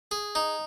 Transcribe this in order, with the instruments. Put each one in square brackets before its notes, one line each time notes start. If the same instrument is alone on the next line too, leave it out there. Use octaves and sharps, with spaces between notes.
[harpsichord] G#4
D#4